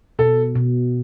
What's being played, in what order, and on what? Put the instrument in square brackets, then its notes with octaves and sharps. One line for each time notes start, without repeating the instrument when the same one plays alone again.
[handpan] B2 [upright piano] A4
[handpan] B2